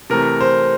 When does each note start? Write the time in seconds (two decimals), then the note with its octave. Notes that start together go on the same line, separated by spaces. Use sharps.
0.10 C3 E3 A3 A#4
0.41 C5